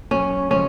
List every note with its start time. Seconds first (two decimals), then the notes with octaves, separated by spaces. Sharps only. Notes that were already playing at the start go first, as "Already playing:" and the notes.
0.11 F#2 C#4
0.49 C#3 F3 G#3 C#4